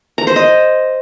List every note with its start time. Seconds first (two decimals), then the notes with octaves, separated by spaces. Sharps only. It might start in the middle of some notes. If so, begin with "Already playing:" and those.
0.18 A#5
0.27 C5
0.36 D#5